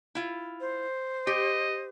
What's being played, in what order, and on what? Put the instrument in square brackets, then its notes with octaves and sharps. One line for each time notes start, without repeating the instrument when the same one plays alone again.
[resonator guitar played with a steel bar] E4 F4
[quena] C5
[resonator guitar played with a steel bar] G4 [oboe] D#5